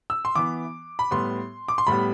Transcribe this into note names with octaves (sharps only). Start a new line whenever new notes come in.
E6
C6
E3 B3 D6
B5
A2 G3 B3 C6
D6
C6
A2 G3 B3 B5